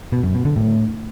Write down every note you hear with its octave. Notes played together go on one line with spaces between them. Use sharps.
B2
F#2
B2
D3
A2